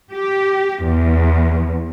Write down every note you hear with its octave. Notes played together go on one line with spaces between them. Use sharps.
G4
E2